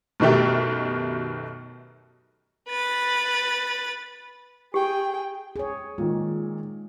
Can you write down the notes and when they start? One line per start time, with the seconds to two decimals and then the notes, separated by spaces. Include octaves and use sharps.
0.20 F#2 B2 D#3 A3 G4
2.69 B4 A6
4.74 G4 G#4 G5
5.56 G#4 C#5
5.98 A#2 D#3 G#3